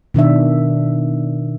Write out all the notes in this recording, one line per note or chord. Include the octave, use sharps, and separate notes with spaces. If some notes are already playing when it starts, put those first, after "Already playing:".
B2 D#3 D4 E5